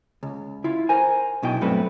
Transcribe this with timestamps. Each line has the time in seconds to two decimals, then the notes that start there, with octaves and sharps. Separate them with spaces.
0.23 C#2
0.64 E4 F4
0.89 A#4 C5 G#5
1.43 B1 B2 E4 G5
1.61 G2 F#3 A3 C4 B4